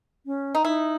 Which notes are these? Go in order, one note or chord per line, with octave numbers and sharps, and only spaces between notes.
C#4
D#4
D#4 E4